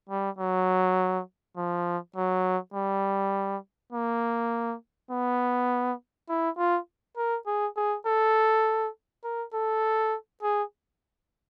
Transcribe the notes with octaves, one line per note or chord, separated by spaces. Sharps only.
G3
F#3
F3
F#3
G3
A#3
B3
E4
F4
A#4
G#4
G#4
A4
A#4
A4
G#4